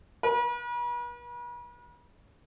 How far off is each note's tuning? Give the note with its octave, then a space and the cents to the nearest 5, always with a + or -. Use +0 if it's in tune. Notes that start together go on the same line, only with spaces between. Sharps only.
B4 -40